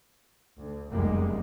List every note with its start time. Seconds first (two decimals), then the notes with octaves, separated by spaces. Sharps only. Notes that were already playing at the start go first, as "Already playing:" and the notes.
0.57 D2
0.91 F1 C#2 F#2 G3 G#3 A#3